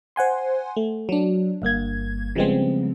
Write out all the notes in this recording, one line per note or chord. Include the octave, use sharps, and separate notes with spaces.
C5 F#5 G#5 C6
A3
F#3 D4
G1 G2 A#3 G#6
C#3 F3 G3 G#3 B3 C4